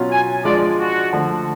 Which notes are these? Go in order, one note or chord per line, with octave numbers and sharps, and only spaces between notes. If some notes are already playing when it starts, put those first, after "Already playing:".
Already playing: B2 F#3 C#4 F4
G#5
F3 G#3 D4 F4 D5
F#4
D3 F3 A3